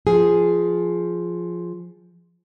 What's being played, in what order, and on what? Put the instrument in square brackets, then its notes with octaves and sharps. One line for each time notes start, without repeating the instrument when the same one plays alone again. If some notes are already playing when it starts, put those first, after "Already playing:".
[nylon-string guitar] F3 G#4